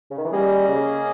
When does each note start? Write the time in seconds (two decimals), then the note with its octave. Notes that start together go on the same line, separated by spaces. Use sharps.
0.10 C#3
0.18 D#3
0.25 E3
0.32 G3 A#3 C#4 G#4 D#5
0.68 C#3